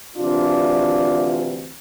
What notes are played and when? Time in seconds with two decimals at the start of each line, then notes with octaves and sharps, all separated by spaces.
0.16 D2 C3 E3 D4 F4